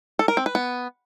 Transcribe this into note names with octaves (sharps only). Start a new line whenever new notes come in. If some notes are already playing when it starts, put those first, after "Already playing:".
A4
A#4
C4
B4
B3